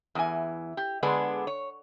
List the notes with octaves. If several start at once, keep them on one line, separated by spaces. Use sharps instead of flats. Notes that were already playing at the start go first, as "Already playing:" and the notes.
E2 E3 G#5
G4
D3 G#3 B3 D4 G#4 B4
C#5